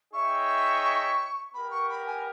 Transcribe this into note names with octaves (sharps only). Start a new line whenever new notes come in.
D#4 G#4 C#5 E5 G5 C#6
B3 G4 A#4 B5
C#6
B5
G#5